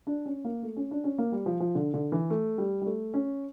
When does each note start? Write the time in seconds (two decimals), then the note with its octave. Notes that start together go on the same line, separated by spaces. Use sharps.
0.07 D4
0.26 C#4
0.44 A#3
0.63 A3
0.76 C#4
0.91 D4
1.04 C#4
1.18 A#3
1.32 G3
1.46 F3
1.60 F3
1.75 D3
1.94 D3
2.12 E3
2.30 A3
2.58 G3
2.81 G3
2.86 A3
3.14 C#4